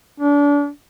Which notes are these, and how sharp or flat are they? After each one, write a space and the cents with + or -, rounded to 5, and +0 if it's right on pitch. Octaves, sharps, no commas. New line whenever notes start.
D4 -30